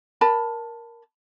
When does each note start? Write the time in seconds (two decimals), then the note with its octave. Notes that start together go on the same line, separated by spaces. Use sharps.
0.21 A#4 A5 B5